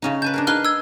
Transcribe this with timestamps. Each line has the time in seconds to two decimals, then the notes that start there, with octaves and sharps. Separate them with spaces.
0.02 C#3 C#4 D#4
0.22 B4 G#5 A5 G6
0.34 D4 G#4 A#4
0.47 D#4 G#4 B4 F6 F#6 G7
0.65 E6 G#6